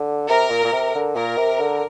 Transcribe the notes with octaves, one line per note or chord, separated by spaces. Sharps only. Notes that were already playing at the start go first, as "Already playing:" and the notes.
Already playing: D3
C3 A#4
A#2
A#2
C3
D3
A#2 A#4
C3
D3